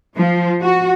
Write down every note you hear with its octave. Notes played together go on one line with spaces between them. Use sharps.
F3
F#4